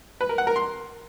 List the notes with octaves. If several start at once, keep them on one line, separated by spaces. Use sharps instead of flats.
B4
A#4
F#5
A#4
C6